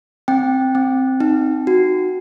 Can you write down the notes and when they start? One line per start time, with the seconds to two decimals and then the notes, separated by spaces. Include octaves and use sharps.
0.28 C4 G5
0.75 C4
1.20 D#4
1.67 F#4